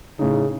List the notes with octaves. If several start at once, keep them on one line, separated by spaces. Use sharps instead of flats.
A2 C#3 A3 D#4